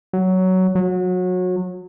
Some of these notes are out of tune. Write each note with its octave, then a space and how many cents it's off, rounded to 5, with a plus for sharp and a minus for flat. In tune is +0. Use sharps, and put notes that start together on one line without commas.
F#3 +10
F#3 -25